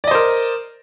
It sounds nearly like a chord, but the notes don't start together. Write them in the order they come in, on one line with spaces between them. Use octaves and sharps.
D5 D#5 C5 A#4